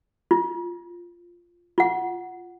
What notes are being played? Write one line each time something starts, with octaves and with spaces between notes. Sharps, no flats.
F4
F4 F#5